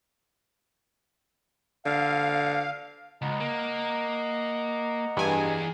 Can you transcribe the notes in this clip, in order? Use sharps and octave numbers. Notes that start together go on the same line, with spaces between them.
D3 F5
C#2 D#5 F#5 A#5
A#3
G2 E3 G#4 G#5